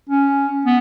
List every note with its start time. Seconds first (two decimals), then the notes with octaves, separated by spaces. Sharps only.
0.09 C#4
0.66 B3